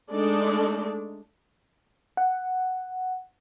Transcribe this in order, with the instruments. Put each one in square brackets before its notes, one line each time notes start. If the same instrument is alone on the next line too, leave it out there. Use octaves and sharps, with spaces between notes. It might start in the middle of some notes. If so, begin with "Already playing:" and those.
[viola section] G#3 A3 D4 D#4 A4 D5
[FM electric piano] F#5